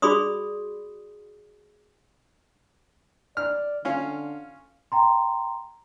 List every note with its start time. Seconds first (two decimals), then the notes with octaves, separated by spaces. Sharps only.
0.02 F#4 G#4 D5 B5 C6 D#6
3.37 D5 F6
3.85 D3 C#4 F4
4.92 G5 A#5 C6